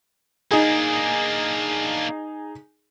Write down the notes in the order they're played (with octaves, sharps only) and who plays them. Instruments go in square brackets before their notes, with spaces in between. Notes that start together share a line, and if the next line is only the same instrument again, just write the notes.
[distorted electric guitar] A#3 D4 [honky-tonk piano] D#4 G#4